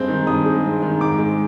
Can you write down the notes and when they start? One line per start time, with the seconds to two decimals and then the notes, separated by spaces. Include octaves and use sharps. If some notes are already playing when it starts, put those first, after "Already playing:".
Already playing: G2 G#3 C4 G6
0.08 D#3
0.27 G2 D#6
0.46 G#3
0.64 C4
0.82 D#3
1.01 G#2 D6
1.18 G#3